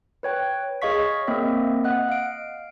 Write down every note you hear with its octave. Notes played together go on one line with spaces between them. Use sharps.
B4 C#5 G5
G#4 C#5 D#5 F5 C#6 B6
A#3 C4 D#5 E5
D#5 F#5 F#6
F5 D7